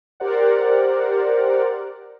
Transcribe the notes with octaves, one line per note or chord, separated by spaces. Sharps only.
G4 A#4 C5 D5 F#5